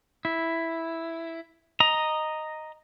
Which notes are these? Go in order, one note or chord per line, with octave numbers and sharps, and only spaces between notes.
E4
D#5 A#5